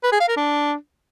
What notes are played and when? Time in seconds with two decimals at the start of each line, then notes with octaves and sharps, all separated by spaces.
0.03 B4
0.12 G#4
0.20 F5
0.28 A#4
0.36 D4